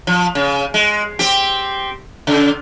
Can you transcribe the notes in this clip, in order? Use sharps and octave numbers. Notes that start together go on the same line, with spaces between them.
F3
C#3
G#3
C4 G4
C#3